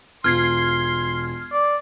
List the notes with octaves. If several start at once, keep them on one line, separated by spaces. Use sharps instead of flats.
E1 F4 C6 F6 G#6 C7
D5